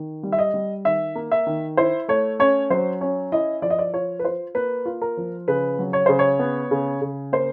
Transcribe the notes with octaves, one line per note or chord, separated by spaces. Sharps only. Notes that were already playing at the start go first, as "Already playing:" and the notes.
Already playing: D#3
G3
E5
D#5
G3
D#3 E5
A#3
E5
D#3
E4 C5
A3 C#5
C#4 C#5
F#3 C5
C#4 C#5
E4 D#5
F3 D5
D#5
D5
F4 C#5
B4
F4 C5
A#3 B4
F4
A#4
F3
C#3 B4
F#3
C#5
C#3 C5
C#5
B3
C#3
C#3
A#3 C5